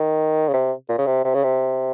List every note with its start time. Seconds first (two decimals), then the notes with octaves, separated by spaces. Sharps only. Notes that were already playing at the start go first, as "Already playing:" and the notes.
Already playing: D#3
0.49 C#3
0.54 C3
0.89 A#2
0.99 C#3
1.06 C3
1.24 C3
1.34 C#3
1.44 C3